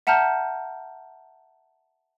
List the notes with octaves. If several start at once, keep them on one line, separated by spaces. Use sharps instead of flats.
E5 F#5 A5 A#5 F6 G6